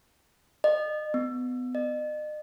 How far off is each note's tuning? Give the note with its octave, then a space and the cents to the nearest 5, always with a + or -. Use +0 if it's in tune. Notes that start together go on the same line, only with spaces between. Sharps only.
D#5 -35
B3 +25
D#5 -40